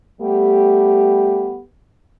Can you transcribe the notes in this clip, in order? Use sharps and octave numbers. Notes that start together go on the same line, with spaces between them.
G3 A3 B3 G4